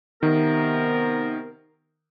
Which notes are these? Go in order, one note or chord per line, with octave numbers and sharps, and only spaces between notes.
C3 D#3 B3 A#4